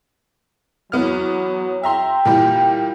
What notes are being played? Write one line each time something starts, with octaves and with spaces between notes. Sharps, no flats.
E2 F#3 B3 F6
E5 G5 A#5 C6
A#2 E3 G3